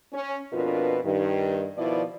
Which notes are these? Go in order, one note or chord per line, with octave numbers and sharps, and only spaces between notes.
C#4
F2 B2 D4 F4 A#4 B4
G2 D#3
B2 D#3 F3 E4 D5